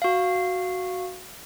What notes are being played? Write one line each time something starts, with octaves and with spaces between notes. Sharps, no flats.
F#4 F5